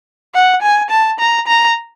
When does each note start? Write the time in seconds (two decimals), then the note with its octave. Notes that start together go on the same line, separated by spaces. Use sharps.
0.34 F#5
0.62 G#5
0.90 A5
1.19 A#5
1.47 A#5